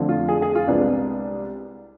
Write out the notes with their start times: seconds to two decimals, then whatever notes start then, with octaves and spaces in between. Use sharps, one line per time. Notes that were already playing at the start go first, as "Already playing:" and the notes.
Already playing: F2 D3 F3 A3
0.09 F4
0.29 G#4
0.42 G#4
0.55 F4
0.68 C2 C3 G#3 B3 D4